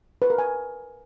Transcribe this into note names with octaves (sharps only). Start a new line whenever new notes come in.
B4
A#4
G#5